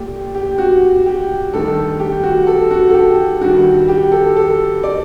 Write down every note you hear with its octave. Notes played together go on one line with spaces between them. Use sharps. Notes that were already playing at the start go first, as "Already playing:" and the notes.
Already playing: A#2 A3 G4
G4
F#4
G4
G2 D#3 A3 A4
G4
F#4
A4
F#4
A4
G4
G2 D#3 G3 F#4
G4
A4
A4
D5